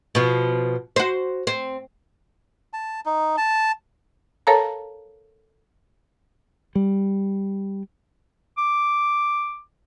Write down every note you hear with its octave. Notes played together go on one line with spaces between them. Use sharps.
B2 F3
F#4 C5
C4
A5
D#4
A5
A4 A#4 C#5 F5 A5 A#5
G3
D6